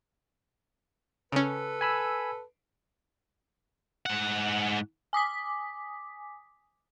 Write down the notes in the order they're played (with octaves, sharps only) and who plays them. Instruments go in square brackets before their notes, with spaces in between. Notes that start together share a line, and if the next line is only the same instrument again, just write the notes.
[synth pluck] C#3 C#4 [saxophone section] A4 B4
[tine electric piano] G#5 B5 E6
[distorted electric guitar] G#2 F#5
[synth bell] G#5 D6 D#6 B6